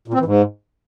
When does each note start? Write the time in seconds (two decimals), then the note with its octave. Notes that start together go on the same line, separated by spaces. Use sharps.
0.08 A#2
0.14 C4
0.19 E3
0.25 G#2